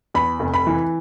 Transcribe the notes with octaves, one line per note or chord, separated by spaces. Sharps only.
E2 B5
F1
B5
E3